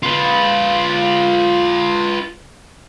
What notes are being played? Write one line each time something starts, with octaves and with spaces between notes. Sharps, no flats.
F4 B4